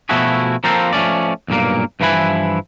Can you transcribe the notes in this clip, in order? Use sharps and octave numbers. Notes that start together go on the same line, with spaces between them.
B2 F3 A3 E4 F#4 G#4
F3 A#3 C4 A4 A#4 C5
F3 A3 C#4 D5
B1 G2 A#2 A#3
G2 E3 F3 E4 B4 G#5